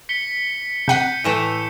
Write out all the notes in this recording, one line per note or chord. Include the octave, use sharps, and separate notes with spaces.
B6 C#7 G7
C3 F#5 G6 B6 C#7 D#7
A2 E3 A3 C#7 D#7 E7